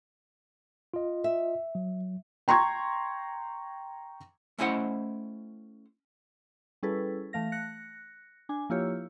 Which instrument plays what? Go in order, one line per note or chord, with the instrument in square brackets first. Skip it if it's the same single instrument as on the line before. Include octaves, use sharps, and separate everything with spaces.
[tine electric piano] F4 D#5
[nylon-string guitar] E5
[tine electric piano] F#3
[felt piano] G5 A#5 C6 C#6 G#6
[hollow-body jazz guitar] A3 C#4 E4 C5 D#5 F#5
[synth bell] G3 C#4 E4 G#4 A4 B4
E3 A3 F5 A#6
F#6 A#6 C#7
D4 G#5
F3 A#3 E4 F4 G4 C#5